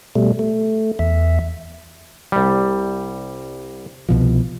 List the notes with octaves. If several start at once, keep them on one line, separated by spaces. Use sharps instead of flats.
B2 G3 A3
A3
E2 E5
C2 G3
C2 B2 F3